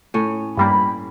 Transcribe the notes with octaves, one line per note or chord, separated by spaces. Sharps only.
A2 C#4
G2 G3 A#3 B5